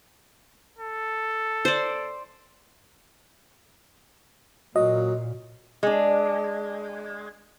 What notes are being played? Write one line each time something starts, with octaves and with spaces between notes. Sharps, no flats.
A4
C5 D5
A#2 F#3 D#5
G#3 D4